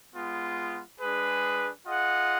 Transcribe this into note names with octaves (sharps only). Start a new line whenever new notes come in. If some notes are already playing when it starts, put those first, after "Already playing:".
G#3 B3 F4
G#3 D4 G#4 B4
F4 G#4 D#5 F#5